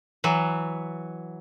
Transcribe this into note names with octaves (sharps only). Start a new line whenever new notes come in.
E3 F#3